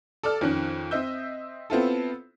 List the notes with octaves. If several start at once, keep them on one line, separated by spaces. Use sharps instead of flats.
A4 D5 A5 F6
F2 D#3 C#4 F#6
C4 D#5 E5 E6 G6
B3 C4 E4 F4 A4